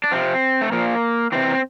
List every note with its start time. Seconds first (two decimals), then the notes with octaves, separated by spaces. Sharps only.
0.04 D4
0.12 C3 F3 C4
0.61 A3
0.72 A#2 F3 A#3
1.32 C3 E3 C4